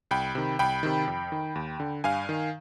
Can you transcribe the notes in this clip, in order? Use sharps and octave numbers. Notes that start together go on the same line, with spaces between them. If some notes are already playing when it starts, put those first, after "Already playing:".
C2 G5 B5
C3 D#3
C2 G5 B5
C3 D#3
F2
D#3
D#2
D3
G2 F5 G#5
D#3